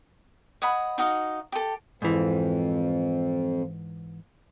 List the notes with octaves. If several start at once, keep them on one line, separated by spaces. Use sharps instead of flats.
C#5 D#5 F#5 B5
D#4 F#4 D#5 F5
G4 A4
F2 G#2 E3